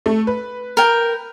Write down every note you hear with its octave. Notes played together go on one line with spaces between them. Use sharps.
A3
B4
A#4 G5